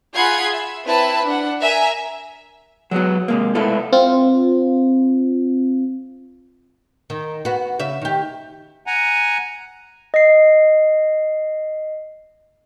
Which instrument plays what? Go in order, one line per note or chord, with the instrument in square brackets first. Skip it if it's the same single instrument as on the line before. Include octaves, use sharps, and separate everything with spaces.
[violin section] F4 G#4 F#5 B5 G#6 C7
E5
C4 E4 B4 A5 B5
D4 F#5
A#4 E5 G#5 A#5
[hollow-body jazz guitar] F#3 G#3 B3 F#4
C3 G#3 A#3
G#3 A3 B3 E4 F4 A4
[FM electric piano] C4 F4
[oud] D#3
B3 F#4
C#3 E5
D#3 G4
[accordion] F#5 G#5 A#5
[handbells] D#5 C7